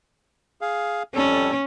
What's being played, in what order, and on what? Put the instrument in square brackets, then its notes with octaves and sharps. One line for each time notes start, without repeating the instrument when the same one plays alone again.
[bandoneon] G#4 F5
[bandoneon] F2 G3 A4 [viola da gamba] C#4